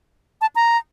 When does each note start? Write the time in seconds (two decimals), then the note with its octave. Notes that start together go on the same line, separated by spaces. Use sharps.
0.41 A5
0.55 A#5